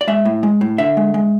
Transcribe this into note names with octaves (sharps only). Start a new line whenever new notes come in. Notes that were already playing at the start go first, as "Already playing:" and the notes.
D5
G#3 E5
A2
G#3
A2
D3 E5
G#3
G#3